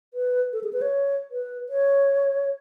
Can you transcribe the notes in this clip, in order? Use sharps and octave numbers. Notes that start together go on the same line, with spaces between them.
B4
A4
G#4
B4
C#5
B4
C#5